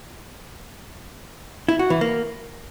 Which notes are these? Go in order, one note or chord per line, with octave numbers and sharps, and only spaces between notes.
E4
F#4
E3
A#3